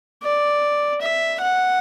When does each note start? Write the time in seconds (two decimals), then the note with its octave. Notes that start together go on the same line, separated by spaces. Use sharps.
0.23 D5
1.01 E5
1.41 F#5